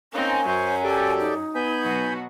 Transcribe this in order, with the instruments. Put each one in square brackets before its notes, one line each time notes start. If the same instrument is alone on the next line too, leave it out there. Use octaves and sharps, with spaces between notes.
[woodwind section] A#3 C#4 [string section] C4 D#4 [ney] G#5
[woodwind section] F#2 [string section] F#3 C#4 [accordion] C5
[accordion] G4 A4 D5
[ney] D#4
[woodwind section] B3 [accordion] G#5 B5 G6
[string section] B2 F#3 F#4